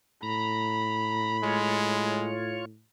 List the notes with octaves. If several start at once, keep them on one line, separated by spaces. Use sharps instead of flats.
A2 A#5 B5
G#3 F4 C#5